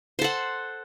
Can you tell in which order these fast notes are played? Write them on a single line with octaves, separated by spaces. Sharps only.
C5 A4 F#5